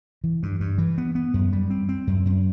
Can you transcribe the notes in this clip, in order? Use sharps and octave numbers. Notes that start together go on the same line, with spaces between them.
E3
G2
G2
E3
B3
B3
F#2
G3
C4
C4
F#2
F#2